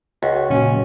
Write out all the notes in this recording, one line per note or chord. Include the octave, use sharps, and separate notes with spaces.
C#2 F#4
A#2 C#3 F#3 C#4